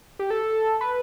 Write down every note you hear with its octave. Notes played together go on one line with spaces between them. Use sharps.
G4
A4
B4